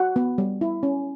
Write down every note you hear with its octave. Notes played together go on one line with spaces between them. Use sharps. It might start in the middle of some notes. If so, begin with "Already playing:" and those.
Already playing: F#4 F#5
B3
G3
E4
C#4